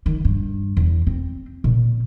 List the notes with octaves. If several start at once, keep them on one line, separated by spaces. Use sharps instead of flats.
D#3
G2
E2
C4
A#2